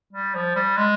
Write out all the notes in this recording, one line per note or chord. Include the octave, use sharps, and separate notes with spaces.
G3
F3
G3
G#3